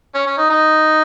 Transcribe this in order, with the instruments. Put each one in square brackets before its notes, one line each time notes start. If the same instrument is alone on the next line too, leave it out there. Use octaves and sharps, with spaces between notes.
[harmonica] C#4
C#4
D#4
D#4